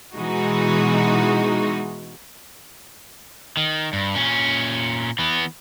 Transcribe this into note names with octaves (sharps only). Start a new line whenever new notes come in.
B2 E3 G#3 D#4 F#4
D#3
G2
A#2 C#4
E3 B3